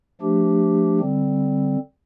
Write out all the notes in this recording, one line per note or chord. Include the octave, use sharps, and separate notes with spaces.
F3 A3 D4 G4
D3 G3 C4